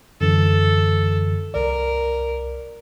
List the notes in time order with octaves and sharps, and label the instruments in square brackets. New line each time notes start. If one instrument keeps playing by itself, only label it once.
[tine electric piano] F#2 D3 E3 [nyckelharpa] A4
[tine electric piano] C2 D5 [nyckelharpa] A#4